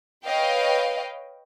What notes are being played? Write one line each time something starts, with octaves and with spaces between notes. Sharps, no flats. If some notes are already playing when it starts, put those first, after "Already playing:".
B4 C#5 D#5 F5 G5